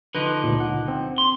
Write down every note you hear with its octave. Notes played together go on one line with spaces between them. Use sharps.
D3 F3 D#4 B4
C#2 A#2
F#5
C4
C6